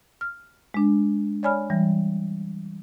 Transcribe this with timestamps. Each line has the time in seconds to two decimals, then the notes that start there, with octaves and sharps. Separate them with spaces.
0.21 F6
0.74 G#3 D4
1.43 C#5 D5 G#5 B5 F6
1.70 E3 G3